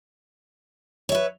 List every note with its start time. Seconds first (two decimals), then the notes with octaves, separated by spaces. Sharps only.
1.09 C#5
1.12 E5
1.15 B4